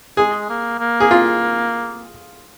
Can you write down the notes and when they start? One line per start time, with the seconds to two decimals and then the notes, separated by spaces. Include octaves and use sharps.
0.17 G#3 G#4
0.49 A#3
0.79 A#3
1.00 G#4
1.11 F4